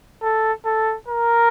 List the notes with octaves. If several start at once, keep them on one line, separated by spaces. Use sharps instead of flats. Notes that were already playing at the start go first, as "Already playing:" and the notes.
A4
A4
A#4